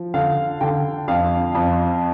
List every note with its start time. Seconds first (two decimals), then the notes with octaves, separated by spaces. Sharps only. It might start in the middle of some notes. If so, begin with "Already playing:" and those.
Already playing: F3
0.14 D3 F5
0.61 D3 G5
1.08 F2 F5
1.55 F2